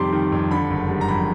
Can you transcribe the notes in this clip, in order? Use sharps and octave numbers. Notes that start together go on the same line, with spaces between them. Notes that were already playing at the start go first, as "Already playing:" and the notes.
Already playing: F2 C3 D#3 G3 C6 D6
D#3
F2
D3 B5
F#1
G3
A#5
F2 B5